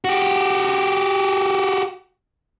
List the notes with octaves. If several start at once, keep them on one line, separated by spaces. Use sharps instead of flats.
F#4 G4